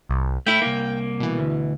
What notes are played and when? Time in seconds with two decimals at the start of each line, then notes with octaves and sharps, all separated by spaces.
0.09 C2
0.46 A3 E4 G5
0.62 C2 A#3
1.20 B2 E3
1.39 D2